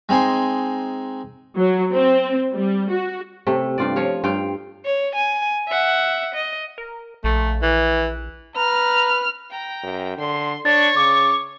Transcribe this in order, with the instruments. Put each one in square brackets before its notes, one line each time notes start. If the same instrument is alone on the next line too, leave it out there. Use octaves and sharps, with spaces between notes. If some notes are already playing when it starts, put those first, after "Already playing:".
[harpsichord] G#3 C4 D#4 G#5 C6
[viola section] F#3
C4
G3
F#4
[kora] C3 A3
G2 F4 D5
F3 C#5 F5
G2 F4 F5 G5
[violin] C#5
G#5
E5 F#5
D#5
[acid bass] A#4
[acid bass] A#1 [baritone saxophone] A3
[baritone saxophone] E3
[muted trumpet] B4 [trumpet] A#5 [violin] F6
[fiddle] G5 A#5
[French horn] F#2
[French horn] D3 [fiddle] C6
[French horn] D4 [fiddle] C#5 C#6 [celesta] A6
[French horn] C#3 [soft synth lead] D6